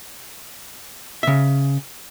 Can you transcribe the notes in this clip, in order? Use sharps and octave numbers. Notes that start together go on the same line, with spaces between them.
C#3 E5